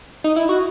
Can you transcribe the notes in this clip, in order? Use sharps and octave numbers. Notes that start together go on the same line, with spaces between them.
D#4
E4
F#4